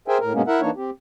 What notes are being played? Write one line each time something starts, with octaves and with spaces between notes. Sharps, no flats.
G#4 A#4 C5 E5 G5 G#5
A2 A#4
G2 B2 G#3 A#3 B3 C#4
E4 A#4 E5 F#5
E3 A#3 D4 D#4 C#5
C4 G4